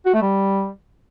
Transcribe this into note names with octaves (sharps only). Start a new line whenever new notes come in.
F#4
A3
G3